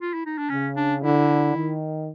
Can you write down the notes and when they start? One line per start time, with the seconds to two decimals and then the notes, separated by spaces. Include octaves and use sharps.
0.01 F4
0.14 E4
0.26 D#4
0.38 D4
0.50 C#3 C#4
0.76 D4
1.02 D3 E4
1.55 D#3